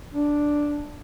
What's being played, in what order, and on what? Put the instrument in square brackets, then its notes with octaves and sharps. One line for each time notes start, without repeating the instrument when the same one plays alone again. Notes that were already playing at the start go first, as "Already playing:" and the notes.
[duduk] D4